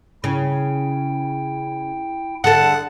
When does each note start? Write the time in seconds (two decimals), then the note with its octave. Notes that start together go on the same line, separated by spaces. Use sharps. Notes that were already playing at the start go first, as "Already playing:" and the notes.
0.24 C#3 E4 G5
2.44 D3 G#4 A4 F#5 A5 F#6